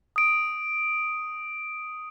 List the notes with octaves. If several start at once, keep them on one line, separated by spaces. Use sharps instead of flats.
D#6 D7